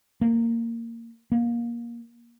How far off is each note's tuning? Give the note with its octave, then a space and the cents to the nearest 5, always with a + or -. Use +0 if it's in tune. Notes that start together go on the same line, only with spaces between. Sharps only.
A#3 -15
A#3 +20